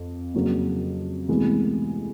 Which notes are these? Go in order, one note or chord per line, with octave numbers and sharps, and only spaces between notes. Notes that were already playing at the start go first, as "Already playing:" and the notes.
Already playing: F2
F2 C#3 F#3 A#3
D2 C3 E3 G#3 B3